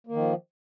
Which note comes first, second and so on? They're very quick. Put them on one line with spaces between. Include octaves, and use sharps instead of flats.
A#3 D#3 F3